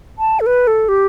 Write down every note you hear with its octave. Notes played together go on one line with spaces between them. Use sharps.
A5
A4
B4
A4
G4